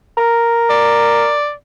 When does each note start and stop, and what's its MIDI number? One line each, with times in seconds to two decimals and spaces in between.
0.17 1.34 70
0.70 1.52 74